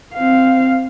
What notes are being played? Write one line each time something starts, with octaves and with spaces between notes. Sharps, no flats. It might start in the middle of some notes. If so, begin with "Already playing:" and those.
C4 F5